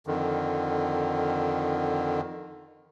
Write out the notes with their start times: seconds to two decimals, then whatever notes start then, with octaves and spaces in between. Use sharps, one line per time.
0.07 F2 D3 D#3